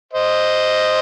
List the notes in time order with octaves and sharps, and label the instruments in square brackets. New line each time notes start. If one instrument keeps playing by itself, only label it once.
[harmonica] C5 D#5